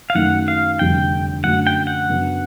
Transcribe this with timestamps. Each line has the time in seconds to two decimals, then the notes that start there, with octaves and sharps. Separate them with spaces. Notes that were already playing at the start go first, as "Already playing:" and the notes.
0.10 F5
0.15 F#2 D#3 F#3 A3 F#5
0.48 F5
0.79 F1 F2 D3 G3 G5
1.44 F#2 D3 F#3 A3 D4 F#5
1.67 G5
1.87 F#5
2.09 F#2 C#3 F#3 B3 D4